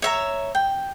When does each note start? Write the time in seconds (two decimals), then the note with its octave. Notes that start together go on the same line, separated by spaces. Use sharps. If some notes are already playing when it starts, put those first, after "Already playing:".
0.02 C#5 E5 A#5
0.55 G5